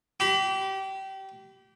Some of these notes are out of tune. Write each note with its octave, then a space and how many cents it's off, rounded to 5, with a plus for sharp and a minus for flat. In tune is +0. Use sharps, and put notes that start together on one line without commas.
G4 -25 B5 +30